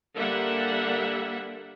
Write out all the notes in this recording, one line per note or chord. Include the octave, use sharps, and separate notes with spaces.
D3 G3 A#3 E5 F#5